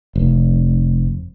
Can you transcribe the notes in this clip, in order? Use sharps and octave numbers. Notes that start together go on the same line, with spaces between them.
F1